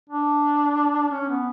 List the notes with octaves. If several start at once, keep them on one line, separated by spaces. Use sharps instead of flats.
D4
C#4
B3